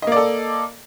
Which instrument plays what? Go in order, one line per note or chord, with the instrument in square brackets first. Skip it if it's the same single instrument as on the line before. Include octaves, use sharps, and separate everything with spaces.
[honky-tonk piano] D#5
A#3
D5
A4